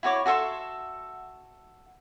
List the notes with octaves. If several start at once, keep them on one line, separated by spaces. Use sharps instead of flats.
E4 F#4 C#5 D6
F#4 A4 E5 C6